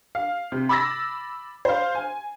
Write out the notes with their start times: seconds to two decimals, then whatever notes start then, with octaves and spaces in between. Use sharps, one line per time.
0.15 F5
0.52 C3
0.69 B5 D6 E6 A6 A#6
1.65 C5 F5
1.95 G#5